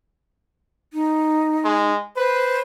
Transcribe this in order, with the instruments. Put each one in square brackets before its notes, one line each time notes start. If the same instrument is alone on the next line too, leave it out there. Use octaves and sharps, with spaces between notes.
[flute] D#4
[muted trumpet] G#3
[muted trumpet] B4 [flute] C5